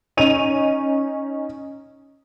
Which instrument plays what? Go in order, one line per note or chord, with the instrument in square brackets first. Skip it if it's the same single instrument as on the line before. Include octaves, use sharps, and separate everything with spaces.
[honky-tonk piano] C#4 D#4 D#7 F7